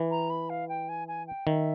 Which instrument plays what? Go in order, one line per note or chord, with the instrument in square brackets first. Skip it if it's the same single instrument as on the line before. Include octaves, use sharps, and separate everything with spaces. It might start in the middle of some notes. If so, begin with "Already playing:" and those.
Already playing: [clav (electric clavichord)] E3
[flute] A#5
B5
F5
G5
G#5
G#5
G5
[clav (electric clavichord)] D#3 [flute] E5